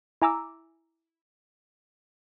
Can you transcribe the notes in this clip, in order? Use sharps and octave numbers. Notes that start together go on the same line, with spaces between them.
E4 G#5 A#5 D6 E6